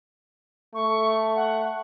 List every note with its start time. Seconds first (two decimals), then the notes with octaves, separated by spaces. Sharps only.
0.75 A3 C#6
1.36 F#5